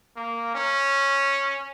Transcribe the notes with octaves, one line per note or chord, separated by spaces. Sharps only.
A#3
C#4